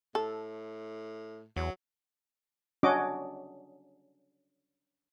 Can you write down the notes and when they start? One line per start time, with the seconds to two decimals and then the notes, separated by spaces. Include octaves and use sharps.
0.15 A2 A4
1.56 E2 F#3
2.83 C#4 D4 F#4 D#5 D6